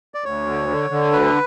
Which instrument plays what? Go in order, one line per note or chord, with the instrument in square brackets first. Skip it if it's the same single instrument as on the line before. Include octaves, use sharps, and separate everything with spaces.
[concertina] D5
[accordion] D2 [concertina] C#5
[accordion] D3
D3
D3
[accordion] D2 [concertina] B4